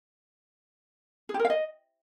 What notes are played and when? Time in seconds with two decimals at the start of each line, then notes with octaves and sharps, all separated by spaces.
1.29 G#4
1.34 G4
1.39 A#4
1.45 F5
1.50 D#5